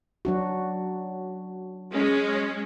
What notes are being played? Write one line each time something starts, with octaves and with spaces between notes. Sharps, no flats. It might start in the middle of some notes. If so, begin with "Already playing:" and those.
F#3 D4 F#4
G#3 C#4